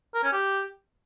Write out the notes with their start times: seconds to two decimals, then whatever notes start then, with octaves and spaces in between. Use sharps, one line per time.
0.14 A#4
0.24 C#4
0.33 G4